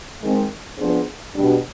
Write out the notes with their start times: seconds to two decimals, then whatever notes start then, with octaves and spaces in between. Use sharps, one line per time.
0.21 D#3 G#3 C4
0.78 F3 B3 D4 G#4 C5
1.34 B2 G3 D4